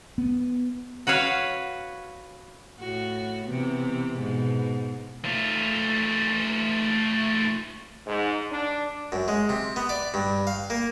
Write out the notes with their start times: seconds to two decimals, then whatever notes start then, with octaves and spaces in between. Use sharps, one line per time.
0.18 B3
1.07 F#4 B4 C#5 F5
2.79 A2 F#4
3.46 C3 E3 B3
4.19 G#2 B2
5.25 A3 F4
8.07 G#2
8.52 D4
9.12 F#2
9.28 G#3
9.49 C3
9.76 B3
9.89 D5
10.14 G2
10.47 F5
10.70 A#3